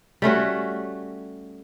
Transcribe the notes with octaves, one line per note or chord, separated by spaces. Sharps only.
G3 A3 C#4 F#4